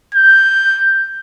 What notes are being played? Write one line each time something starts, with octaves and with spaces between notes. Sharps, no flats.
G6